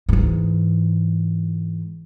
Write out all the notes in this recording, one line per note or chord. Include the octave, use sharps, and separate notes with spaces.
G#2 E3